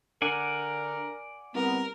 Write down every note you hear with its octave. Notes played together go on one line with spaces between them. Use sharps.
D3 A#4 D5 F#5 G#5
C2 B3 A#4